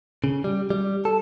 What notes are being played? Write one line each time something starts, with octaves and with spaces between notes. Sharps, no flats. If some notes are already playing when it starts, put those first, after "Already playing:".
C#3
G3
G3
A4